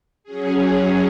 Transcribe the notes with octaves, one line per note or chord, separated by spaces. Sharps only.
F#3 C#4 G#4